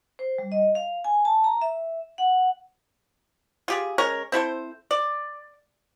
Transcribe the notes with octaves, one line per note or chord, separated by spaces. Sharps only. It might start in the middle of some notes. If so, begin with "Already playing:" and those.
C5
G3
D#5
F5
G#5
A5
A#5
E5
F#5
F4 G4 G#4
G#3 C#4 A#4 C#5
C4 E4 A4 C5
D5